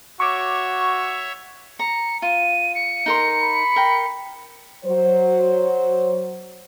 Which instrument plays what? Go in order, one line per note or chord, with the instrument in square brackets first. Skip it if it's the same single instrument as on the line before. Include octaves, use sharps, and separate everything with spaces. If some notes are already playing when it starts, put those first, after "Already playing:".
[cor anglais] F#4 [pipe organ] C#5 E5 [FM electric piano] C#6 D6
[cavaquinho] A#5 [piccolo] C#7
[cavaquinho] F4 [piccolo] D#7
[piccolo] C#7
[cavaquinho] D#4 A#4 C6
[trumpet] B5
[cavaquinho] A#4 G5
[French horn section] F#3 C5